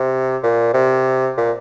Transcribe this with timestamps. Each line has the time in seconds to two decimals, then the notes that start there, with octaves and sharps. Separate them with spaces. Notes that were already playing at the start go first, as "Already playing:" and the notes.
Already playing: C3
0.43 A#2
0.74 C3
1.37 A#2